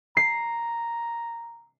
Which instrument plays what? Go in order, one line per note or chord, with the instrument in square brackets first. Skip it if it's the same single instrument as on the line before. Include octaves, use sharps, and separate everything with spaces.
[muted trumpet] A#5 [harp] C7